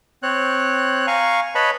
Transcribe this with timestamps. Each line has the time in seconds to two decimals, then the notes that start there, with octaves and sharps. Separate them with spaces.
0.23 C4 C#5 F#6
1.07 F5 G#5 A#5 C#6
1.55 B4 C#5 D#5 A5 B5